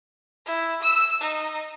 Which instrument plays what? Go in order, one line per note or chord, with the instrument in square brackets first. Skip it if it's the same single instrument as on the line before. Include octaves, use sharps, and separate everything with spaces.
[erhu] E4
E6
D#4